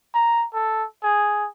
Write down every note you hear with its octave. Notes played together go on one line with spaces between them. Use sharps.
A#5
A4
G#4